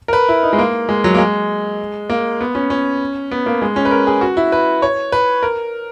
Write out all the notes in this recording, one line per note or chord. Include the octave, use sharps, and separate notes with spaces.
A#4
B4
E4
D#4
G#3
A#3
G#3
F#3
A#3
G#3
A#3
B3
C#4
C#4
B3
A#3
G#3
C#4
B4
A#4
G#4
F#4
E4
B4
C#5
B4
A#4